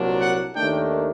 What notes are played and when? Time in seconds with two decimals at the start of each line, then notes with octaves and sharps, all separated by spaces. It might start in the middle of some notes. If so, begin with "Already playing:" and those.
Already playing: C2 A#2 F#3 A#3 D4
0.20 F#5
0.55 D#2 D#3 A3 D4 G5